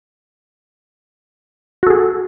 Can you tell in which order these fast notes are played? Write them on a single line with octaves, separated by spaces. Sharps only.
F#4 A4 G#4